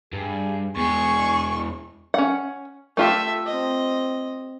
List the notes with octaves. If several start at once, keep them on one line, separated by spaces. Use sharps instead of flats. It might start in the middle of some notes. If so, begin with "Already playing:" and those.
G2 G#4
E2 G#3 G#4 C#6
C#4 F#5
A3 F4 G4 A4 E5
C4 D#5